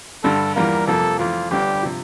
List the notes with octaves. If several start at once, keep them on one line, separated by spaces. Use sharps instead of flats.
G2 D3 G3 A4
E2 E3 G3 A#3 F4 A#4
F2 C3 F3 A#3 A4
F2 E3 A3 F4
G1 G2 D3 G3 D4 G4
C3 F3